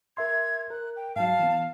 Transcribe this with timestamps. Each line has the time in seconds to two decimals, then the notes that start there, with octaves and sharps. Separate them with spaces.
0.17 A#4 E5 C6 G#6
0.70 A#4 F#6
0.96 G5
1.16 G#2 F#3 F5 A5
1.39 E3 B3